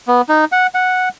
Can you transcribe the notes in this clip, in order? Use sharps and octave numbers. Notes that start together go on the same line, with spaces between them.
B3
D#4
F#5
F#5